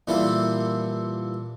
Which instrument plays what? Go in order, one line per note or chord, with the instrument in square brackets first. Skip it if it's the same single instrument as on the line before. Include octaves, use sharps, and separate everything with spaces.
[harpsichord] A#2 E3 G3 E4 A4